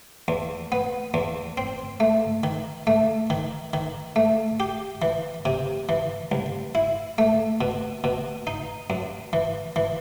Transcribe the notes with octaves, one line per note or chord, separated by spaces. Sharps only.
E2
B3
E2
C4
A3
D#3
A3
D#3
D#3
A3
G4
E3
C3
E3
C2
E4
A3
B2
B2
D#4
F#2
E3
E3